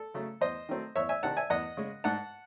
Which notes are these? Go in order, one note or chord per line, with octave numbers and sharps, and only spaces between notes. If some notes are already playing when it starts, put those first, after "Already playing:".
Already playing: A4
C#3 F#3 A3
E2 C5 D#5
D#3 F#3 A3 C4
E2 C#5 E5
E5 G#5
C3 D#3 F#5 A5
E5 G#5
E2 D#5 F#5
C#3 G#3
G#2 F#5 A5